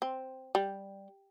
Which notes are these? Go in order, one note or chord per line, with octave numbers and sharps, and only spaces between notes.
C4
G3